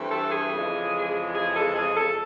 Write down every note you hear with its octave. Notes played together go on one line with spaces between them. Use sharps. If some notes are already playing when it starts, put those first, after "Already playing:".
Already playing: G2 E3 A3 C4
A4
G#4
F2 C#3 E3 G#3
G#4
A4
G#4
A4